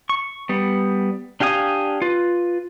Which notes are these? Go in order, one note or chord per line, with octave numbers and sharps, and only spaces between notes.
C#6
G3 B3
D4 G4 F5 G#5 D#6
F4 B4